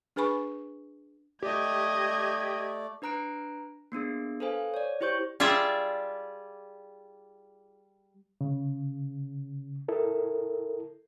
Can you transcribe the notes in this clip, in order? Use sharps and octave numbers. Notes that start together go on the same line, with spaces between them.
D4 G#4 B4 G#5 B5 C#6
A3 G4 D5 D#5 G#6
D4 B4 A#5 F#6 D7
A#3 B3 D4 G#4
A4 B4 C5 F5 G#5
C#5 D5
E4 G4 C5 C#6 G6
G3 F4 G#4 D5 E5
C#3
E4 A4 A#4